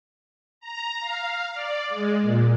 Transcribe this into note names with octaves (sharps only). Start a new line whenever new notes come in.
A#5
F5
D5
G#3
A#2